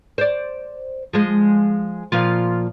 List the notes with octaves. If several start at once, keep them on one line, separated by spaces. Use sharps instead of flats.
C5 D5
F3 G#3
A#2 F3 F4